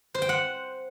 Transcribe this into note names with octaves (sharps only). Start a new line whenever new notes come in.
C5
G5
F#5